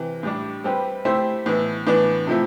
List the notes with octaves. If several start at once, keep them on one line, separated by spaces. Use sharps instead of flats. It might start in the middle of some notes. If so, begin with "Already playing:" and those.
Already playing: C3 E3
A2 G3 D4
G3 C4 G4 B4
A3 C4 E4 G4 C5
A2 E3 B3 E4
A2 E3 B3 D4
C3 F3 A3 E4